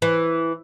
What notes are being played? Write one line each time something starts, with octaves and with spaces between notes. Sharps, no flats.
E3